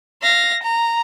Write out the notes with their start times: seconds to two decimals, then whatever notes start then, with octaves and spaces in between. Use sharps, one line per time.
0.23 F5 A#6
0.63 A#5